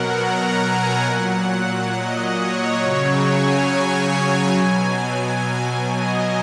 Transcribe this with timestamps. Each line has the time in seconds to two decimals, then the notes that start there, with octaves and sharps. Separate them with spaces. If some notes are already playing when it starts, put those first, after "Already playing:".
Already playing: B2 F#3 A#4 F#5
0.18 A#5
0.61 G#5
1.05 A#2 F#3 F#5
1.94 D#5
2.37 C#5
2.81 C#3 F#3 C#5
3.26 G#5
4.57 B2 F#3 G#5
5.89 D#5